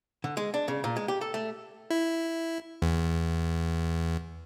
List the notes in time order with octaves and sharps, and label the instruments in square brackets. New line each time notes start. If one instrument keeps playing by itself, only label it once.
[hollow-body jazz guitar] D3
G#3
D4
C#3
A#2
G#3
G4
A4
A3
[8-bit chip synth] E4
E2